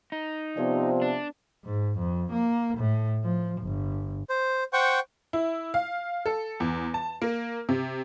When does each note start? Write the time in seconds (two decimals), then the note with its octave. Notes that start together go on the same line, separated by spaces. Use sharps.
0.12 D#4
0.57 C3 F3 B3 B4 D5
1.02 D4
1.65 G#2
1.98 F2
2.32 A#3
2.78 A2
3.24 F3
3.62 G1
4.30 C5
4.73 C5 F#5 G5 C#6
5.33 E4
5.74 F5
6.26 A4
6.60 E2
6.94 A5
7.22 A#3
7.69 C3